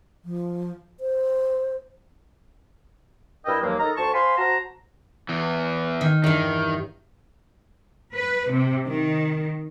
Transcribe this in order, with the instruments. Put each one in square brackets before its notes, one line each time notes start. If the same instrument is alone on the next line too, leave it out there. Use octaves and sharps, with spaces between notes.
[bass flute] F3
C5
[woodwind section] G2 E4 A#4 D#5 G5 E6
D#2 F3 F#3 G#3 A#3
D#4 A4 A#4 D#5 A#5
D2 C5 A5 C#6
C5 F5 G#5 B5 C6
F#4 C5 A5 A#5
[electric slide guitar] E2 E3
[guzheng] D#3
[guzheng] E2 G2 [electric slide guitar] D#3
[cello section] B4
C3
D#3